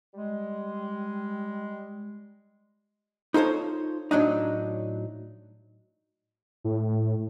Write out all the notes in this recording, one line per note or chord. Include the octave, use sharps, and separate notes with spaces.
G3 G#3
D#4 F4 A4 C5 C#5
A2 F#3 D4 D#4
A2